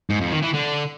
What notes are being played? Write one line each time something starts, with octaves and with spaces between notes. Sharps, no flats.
G#2
F2
D#3
E3
D3